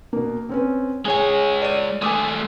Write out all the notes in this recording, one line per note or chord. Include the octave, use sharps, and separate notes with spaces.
B2 A#3
C4 C#4 B4
G#3 G#4 C#5 G#5
D5 D#7
G#3 A3 G#5 D6 D#6